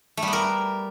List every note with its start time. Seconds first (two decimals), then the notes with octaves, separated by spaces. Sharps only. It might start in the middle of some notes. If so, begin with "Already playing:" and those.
0.17 A3
0.23 G3
0.28 B3
0.33 A#4